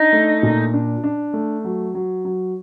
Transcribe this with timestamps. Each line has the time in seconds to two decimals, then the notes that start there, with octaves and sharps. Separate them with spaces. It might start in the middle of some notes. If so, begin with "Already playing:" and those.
Already playing: D4 D#4
0.13 A3
0.43 A#2
0.74 D4
1.04 D4
1.33 A3
1.64 F#3
1.94 F#3
2.25 F#3